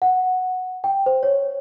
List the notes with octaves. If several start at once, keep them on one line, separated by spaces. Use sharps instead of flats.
F#5
G5
C5
C#5